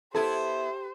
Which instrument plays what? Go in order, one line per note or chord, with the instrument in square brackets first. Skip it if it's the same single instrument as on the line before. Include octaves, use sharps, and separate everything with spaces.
[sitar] B3 E4 [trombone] G4 [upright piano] A4 [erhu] C5